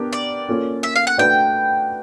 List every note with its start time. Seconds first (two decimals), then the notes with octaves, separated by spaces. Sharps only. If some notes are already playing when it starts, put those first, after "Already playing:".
Already playing: B3 D4 G4 A#4
0.13 D5
0.48 A#3 C#4 F4 A4
0.83 E5
0.96 F5
1.07 F#5
1.18 A3 D4 F#4 B4 D5 G5